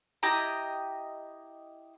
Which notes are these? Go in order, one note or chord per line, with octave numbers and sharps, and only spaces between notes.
E4 G4 D#5 A#5